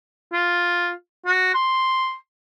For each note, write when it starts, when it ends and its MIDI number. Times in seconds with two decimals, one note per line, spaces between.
0.33 0.92 65
1.26 1.54 66
1.55 2.15 84